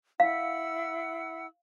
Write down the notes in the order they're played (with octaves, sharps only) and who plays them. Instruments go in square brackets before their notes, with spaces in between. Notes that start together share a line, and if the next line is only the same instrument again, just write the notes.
[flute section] E4 F#5 E6 [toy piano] F5